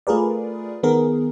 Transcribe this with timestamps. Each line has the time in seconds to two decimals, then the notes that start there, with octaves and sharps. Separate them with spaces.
0.07 A3 F4 G#4 A#4 B4 D5
0.83 D#3 B3 G#4 A#4